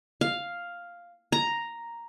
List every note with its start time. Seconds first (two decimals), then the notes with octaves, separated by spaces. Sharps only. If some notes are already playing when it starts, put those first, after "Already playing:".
0.21 F5
1.32 A#5